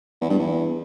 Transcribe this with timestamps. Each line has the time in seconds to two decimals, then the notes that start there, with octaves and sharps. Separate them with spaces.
0.21 E2
0.30 G2
0.39 E2